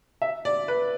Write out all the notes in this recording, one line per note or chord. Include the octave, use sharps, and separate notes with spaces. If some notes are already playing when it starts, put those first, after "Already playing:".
E5
D5
B4